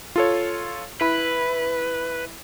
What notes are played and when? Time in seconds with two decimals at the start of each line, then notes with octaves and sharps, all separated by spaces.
0.16 F4 A4 C#5
1.01 E4 B4 B5